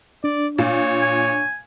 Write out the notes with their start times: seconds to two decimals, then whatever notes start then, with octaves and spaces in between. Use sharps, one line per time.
0.24 D4 D5
0.58 A#2 C#5
1.01 G#5